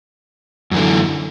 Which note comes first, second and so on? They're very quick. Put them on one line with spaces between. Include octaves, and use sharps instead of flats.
F#2 E3 D3